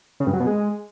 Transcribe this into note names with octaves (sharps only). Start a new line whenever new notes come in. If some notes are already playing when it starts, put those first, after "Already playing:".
C#3
G2
F#3
B2
G#3